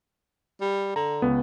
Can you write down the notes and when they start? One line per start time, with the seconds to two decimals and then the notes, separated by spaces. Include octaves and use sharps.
0.61 G3
0.96 D3 A#5
1.22 C#2 B3